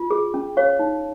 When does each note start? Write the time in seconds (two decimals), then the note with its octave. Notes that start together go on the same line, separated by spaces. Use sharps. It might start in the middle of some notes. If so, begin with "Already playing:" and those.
Already playing: F4
0.11 G#4
0.34 C#4
0.57 C#5 F5
0.79 D#4